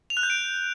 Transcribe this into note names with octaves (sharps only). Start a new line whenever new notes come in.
F7
F#6
G6
D7